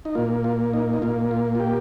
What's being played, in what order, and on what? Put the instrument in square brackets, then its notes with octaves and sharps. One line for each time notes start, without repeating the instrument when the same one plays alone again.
[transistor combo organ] D#4
A#2 A#3 F4
F4
D#4
D#4
A#2 A#3 F4
F4
F4
G4